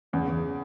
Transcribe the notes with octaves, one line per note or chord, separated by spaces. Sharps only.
E2 C#3
E2